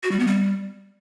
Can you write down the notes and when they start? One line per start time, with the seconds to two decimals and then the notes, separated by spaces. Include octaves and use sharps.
0.03 F#4
0.11 G3
0.19 B3
0.27 G3